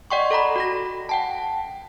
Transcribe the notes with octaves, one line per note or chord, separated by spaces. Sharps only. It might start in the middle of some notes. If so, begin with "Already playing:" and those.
D5 D#5 F#5 G5 C6 C#6
A4 F#5 A#5 B5
F#4 B5 A#6
F#5 G5 A5